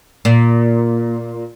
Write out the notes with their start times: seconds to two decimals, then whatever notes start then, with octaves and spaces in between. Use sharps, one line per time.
0.25 A#2